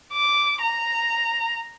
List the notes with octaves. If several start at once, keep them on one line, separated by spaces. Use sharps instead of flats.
D6
A#5